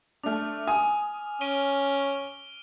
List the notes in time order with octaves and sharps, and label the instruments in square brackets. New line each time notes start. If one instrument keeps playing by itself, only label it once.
[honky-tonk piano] A3 D4 [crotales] D6 F6
[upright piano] G#5 [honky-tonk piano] D#6
[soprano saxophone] C#4 [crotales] D7 D#7 G7